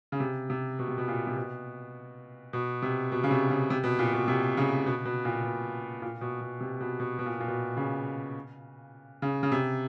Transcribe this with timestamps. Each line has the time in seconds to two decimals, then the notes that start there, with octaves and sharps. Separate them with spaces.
0.12 C#3
0.20 C3
0.50 C3
0.79 B2
0.88 C3
0.98 B2
1.08 A#2
1.27 C3
1.36 B2
2.53 B2
2.82 C3
3.12 B2
3.24 C#3
3.31 C3
3.50 C#3
3.70 C3
3.84 B2
3.99 A#2
4.13 B2
4.28 C3
4.57 C#3
4.86 B2
5.05 B2
5.25 A#2
5.44 B2
6.02 A#2
6.21 B2
6.41 B2
6.61 C3
6.80 B2
7.00 B2
7.19 B2
7.26 A#2
7.40 A#2
7.48 B2
7.77 C#3
9.22 C#3
9.43 C#3
9.52 C3